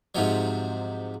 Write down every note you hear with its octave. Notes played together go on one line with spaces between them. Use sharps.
G#2 C3 F3 F#3